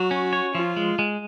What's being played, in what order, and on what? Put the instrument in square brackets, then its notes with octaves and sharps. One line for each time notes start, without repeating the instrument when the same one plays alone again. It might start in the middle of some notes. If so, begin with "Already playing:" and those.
Already playing: [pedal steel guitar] F#3 [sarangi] F#4
[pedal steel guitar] C#4
C#5
[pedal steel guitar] F3 [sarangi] F4
[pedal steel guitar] G#3
G#3